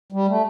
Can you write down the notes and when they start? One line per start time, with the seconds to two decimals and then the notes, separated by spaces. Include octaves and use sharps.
0.12 G3
0.28 A3